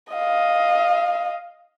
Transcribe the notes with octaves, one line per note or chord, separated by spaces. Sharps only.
D#5 F5